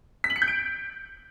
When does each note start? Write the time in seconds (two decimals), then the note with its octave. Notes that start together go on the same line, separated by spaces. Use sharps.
0.24 B6
0.30 F#7
0.36 C#7
0.42 G6
0.48 D7